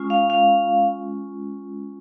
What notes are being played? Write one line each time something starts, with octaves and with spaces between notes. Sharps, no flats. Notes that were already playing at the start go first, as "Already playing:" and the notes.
Already playing: G#3 C#4 F4
F5
F5